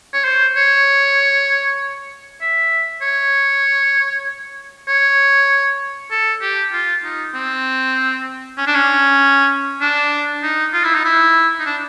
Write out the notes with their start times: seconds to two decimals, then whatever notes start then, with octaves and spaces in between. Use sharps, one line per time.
0.13 C#5
0.24 C5
0.56 C#5
2.41 E5
3.02 C#5
4.88 C#5
6.11 A4
6.42 G4
6.72 F4
7.03 D#4
7.34 C4
8.58 C#4
8.67 D4
8.75 C#4
9.81 D4
10.43 D#4
10.73 F4
10.84 E4
10.94 D#4
11.05 E4
11.59 D#4
11.66 D4